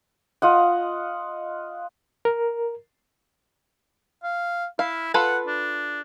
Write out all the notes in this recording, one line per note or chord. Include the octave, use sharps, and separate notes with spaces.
F4 D#5 F#5
A#4
F5
E4 F5
F4 A4 B4 F#5
D4